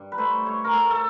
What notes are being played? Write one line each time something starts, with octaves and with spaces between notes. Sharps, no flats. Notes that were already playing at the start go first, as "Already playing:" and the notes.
Already playing: G2
B4
A3 C5
A3 C#5
A#4
A3 A4
A4